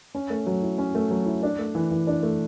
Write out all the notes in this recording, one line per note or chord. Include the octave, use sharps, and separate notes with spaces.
C#4
A3
F#3
E4
C#4
A3
F#3
E4
D4
A3
E3
E3
D4
A3